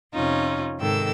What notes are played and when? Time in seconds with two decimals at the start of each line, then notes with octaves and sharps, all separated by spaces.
0.14 F2 C3 C#4 D#4 F4
0.79 G#2 C3 D#3 A4 G5 E6